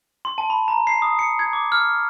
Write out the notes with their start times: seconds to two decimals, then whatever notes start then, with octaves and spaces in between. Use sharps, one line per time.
0.25 C6
0.38 A5
0.50 B5
0.68 A#5
0.87 C7
1.02 D#6
1.19 C#7
1.39 G#6
1.53 D6
1.72 F6